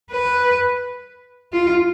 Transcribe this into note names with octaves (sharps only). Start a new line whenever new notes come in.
B4
F4